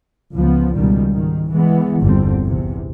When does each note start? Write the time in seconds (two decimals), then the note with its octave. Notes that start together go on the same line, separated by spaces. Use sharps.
0.36 C#2 F3 B3
0.76 C#2 G#2 B2 D#3 G3
1.10 G#2 D#3
1.51 E3 G#3 B3
2.02 G1 E2 D3 G3 C4
2.43 A#1 E2 C3